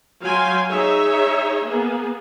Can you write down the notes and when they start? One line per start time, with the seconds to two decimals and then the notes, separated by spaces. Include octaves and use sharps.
0.22 F#3 F5 G5 G#5 C6
0.69 D#4 G#4 C#5 E5
1.68 A#3 B3 G#4